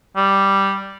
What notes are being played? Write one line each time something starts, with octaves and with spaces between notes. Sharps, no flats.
G3